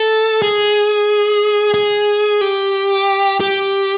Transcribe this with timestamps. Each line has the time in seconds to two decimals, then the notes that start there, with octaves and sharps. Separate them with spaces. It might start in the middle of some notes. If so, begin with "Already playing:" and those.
Already playing: A4
0.42 G#4
1.74 G#4
2.41 G4
3.40 G4